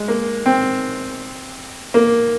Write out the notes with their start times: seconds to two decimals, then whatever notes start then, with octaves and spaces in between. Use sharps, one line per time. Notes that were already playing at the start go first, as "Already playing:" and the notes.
Already playing: G#3
0.08 A#3
0.46 C4
1.94 A#3